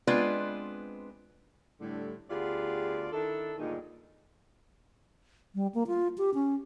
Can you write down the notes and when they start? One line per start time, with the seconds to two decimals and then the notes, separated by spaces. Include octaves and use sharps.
0.07 G#3 B3 C4 D4 F4 B4
1.80 A2 D3 G3
2.29 D2 B3 F4 G4 G#4 D5
3.12 D#3 D4 E4 A4
3.58 D2 G2 A#2 D#3 D#4 G#4
5.55 G3
5.75 A#3
5.87 F4
6.18 G4
6.34 C#4